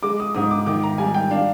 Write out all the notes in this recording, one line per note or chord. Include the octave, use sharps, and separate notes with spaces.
G#3 D6
D#6
G#2 D#6
D6
D#3 D6
A#5
G3 G#5
G5
D4 F5